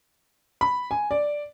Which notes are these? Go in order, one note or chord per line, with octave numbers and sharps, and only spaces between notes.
B5
G#5
D5